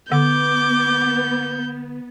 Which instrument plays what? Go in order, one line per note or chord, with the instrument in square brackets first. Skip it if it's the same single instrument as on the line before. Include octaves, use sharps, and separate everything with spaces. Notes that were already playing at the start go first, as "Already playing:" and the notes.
[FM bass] D3 [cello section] B3 [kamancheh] D6 [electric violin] G6